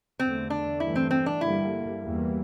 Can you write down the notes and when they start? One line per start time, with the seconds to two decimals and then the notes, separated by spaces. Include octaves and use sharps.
0.19 E2 D3 A3 C4
0.50 D4
0.80 G2 E3 A3 E4
0.96 C4
1.11 C4
1.26 D4
1.41 G2 D3 G3 A#3 E4
2.02 E2 E3 G3 A#3